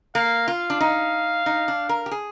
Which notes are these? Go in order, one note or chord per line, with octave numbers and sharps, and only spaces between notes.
A#3 F5
F4 F5
D4
D#4
D#4
D4
A#4
G4
G#4